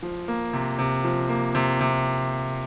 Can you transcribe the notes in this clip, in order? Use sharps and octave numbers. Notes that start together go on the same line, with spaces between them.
F3
A#3
C3
C3
F3
A#3
C3
C3